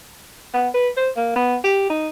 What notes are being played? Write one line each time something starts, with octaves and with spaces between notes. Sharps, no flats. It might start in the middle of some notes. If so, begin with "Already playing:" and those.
B3
B4
C5
A#3
B3
G4
D#4